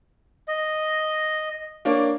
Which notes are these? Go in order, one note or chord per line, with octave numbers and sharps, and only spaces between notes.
D#5
A#3 D4 C#5